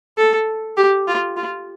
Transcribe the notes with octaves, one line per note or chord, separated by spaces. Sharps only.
A4
G4
F4
F4